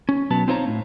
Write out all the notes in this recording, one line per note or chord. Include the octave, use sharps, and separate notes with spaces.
C#4
B1 F#3 B3 A5
C4 D#4 F4 C5 C#5 A#5
A2